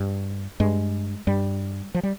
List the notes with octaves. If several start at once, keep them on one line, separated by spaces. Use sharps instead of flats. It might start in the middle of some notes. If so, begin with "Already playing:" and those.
Already playing: G2
G2 G#3
G2 G3
F3
G3